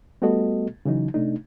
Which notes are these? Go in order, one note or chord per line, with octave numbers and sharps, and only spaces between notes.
G3 A3 B3 F#4 A4 D#5
C#3 E3 F#3 D#4
C3 A3 D4 D#4